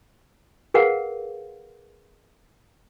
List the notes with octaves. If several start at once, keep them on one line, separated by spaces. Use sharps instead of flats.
G#4 A#4 B4 F5 F#5